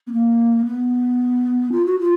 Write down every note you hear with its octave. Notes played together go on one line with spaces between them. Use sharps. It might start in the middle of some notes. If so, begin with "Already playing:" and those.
B3
A#3
B3
F4
F#4
F4